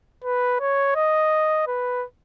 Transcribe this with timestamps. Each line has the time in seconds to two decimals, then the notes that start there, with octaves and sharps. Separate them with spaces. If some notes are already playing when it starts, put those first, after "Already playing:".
0.24 B4
0.60 C#5
0.96 D#5
1.67 B4